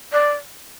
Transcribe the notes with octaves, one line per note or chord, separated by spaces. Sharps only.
D5